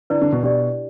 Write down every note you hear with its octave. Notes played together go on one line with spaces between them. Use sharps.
D3 E4 B4 D5
D3
B2
B2 D4 G4 D5